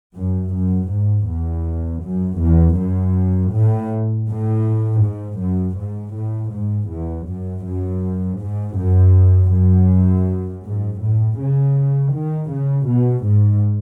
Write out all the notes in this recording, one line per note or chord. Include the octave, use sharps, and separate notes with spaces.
F#2
F#2
G#2
E2
F#2
E2
F#2
A2
A2
G#2
F#2
G#2
A2
G#2
E2
F#2
F#2
G#2
F#2
F#2
G#2
A2
C#3
D#3
C#3
B2
G#2